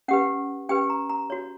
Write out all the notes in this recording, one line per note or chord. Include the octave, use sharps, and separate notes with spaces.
C#4 G4 B4 F#5
C#4 G4 B4 G5
A#5
A#5
F#4 C#5